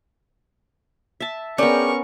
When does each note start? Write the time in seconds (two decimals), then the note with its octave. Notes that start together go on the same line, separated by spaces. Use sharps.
1.20 E5 A5
1.58 B3 C#4 D4 G#4 A#4 G5 C#6